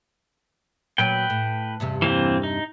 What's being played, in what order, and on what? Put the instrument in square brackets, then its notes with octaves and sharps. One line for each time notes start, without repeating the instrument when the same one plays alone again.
[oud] A#2 F#3 C#5 [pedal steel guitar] B4 G5
[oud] A2
E2 G2 C3
[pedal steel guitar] E3 A#3 C4
D#4